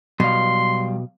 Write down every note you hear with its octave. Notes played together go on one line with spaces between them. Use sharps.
B2 F#3 G3 F5 C6